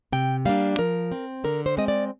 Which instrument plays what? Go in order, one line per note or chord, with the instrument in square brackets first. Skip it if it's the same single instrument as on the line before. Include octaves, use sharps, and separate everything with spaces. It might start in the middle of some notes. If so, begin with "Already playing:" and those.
[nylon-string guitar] C3 G5
G3 A#3 D4 F5
F3 A#4
C4
D3 A#4
C5
G#3 C4 D#5
D5